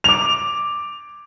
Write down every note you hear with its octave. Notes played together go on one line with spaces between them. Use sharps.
D6 F7